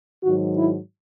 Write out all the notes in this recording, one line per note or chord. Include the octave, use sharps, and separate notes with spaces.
G#2 D#3 F#3 F#4
E4